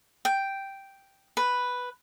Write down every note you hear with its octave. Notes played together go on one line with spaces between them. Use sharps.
G5
B4